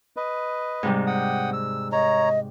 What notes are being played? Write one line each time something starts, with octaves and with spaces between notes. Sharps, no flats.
B4 D#5
G#2 C3 G3
F#5 G5 D#6
E6
C#5 D#5 A#5